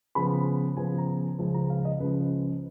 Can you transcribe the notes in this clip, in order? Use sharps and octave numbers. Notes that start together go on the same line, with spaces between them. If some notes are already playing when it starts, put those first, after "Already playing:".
C#3 F3 B3 B5
C#3 F3 B3 G#5
A#5
C#2 C#3 F3
A#5
F5
D#5
C#2 C#3 F3 B4